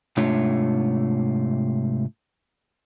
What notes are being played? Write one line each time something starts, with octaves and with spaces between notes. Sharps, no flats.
G#2 C3 A3 D4 F4 C#5